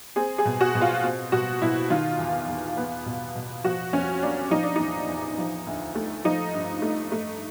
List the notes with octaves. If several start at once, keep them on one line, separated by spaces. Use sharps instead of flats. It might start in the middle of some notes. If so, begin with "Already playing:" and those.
C4 G#4
G#4
B2
F#4
B2
F4
C4
B2 F#4
B2 E4
D#3 F4
E2
E2
B3
B2
B2
F3 F#4
F2 C#4
A#3 D4
F3 D#4
D4
E2 D#4
E2
F3
D2
A3
F3 D#4
G2
A3
A3